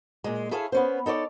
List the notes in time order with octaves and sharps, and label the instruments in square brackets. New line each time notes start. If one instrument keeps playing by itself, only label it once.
[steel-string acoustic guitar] A#2 G#3
E4 G#4 A4 C#5 E5 F5
B3 C#4 C5
D#4 A4 C#5 D5